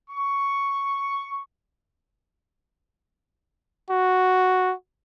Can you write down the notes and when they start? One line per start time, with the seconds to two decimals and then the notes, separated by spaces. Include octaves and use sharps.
0.10 C#6
3.90 F#4